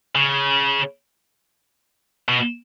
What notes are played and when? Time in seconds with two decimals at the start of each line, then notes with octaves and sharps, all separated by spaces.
0.15 C#3
2.29 B2